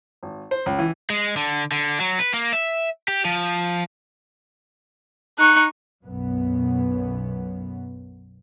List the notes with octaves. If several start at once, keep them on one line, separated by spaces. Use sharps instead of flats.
G#1
C5
C#2
E3
G#3
D3
D3
F#3
B4
A#3
E5
G4
F3
D#4 C#6 F#6
B1 F#2 B3